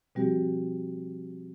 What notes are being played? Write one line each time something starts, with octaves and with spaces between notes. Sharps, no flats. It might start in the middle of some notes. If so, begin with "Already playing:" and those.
B2 F3 G3 C4 F#4 G4